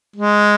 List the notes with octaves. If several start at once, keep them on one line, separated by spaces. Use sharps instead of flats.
G#3